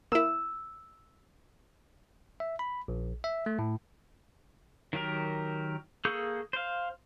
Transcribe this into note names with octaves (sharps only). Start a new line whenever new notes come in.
A#3 E4 E6
E5
B5
A#1
E5
A3
A2
D#3 F#3 G4 A#4
A#3 G#4 A4 C#6 G6
C5 F5